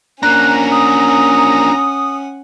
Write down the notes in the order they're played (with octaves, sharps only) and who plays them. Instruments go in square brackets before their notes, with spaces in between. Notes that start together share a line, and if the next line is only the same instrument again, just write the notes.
[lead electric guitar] A#3 D4 [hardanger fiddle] C#4 F#5 [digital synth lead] A#5 [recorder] F#6
[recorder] D#6